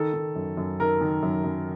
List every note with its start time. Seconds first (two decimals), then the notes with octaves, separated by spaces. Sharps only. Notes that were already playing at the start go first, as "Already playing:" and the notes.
Already playing: D#3 A4
0.14 D#3
0.36 F#2
0.57 F#2
0.79 D#3 A#4
1.01 D#3
1.23 F#2
1.44 F#2